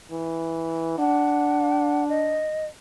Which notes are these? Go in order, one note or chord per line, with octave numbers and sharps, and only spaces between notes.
E3
D4 F#5
D#5